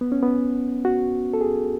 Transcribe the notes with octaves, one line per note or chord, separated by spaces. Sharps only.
B3
C#4
B3
F#4
A4
G#4